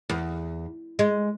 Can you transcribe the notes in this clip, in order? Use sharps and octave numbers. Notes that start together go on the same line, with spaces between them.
E2
G#3